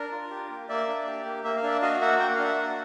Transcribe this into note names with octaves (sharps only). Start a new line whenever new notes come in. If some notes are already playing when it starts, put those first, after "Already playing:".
Already playing: D4 A#4
F4
G4
A#3
A#3 D5 E5
D4
G4
A#3
A#3 E5
F5
D4 D5 E5
F#4 D#5 F5
A#3 E5 F#5
A#3 G5
F#5
F5
D4 E5 F#5
F#4